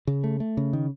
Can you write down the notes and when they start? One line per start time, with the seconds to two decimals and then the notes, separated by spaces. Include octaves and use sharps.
0.07 C#3
0.24 A3
0.40 A3
0.57 C#3
0.73 D#3